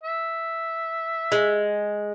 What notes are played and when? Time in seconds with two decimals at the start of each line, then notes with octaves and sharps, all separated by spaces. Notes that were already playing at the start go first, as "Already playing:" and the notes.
0.04 E5
1.32 G#3